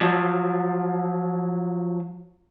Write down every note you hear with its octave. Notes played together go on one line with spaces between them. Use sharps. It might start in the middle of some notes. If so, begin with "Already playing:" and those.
F3 F#3